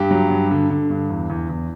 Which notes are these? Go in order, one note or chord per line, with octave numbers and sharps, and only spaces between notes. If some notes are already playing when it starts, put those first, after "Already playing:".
Already playing: G2 G4
F#3
G2
D3
D3
G2
E2
E2
E2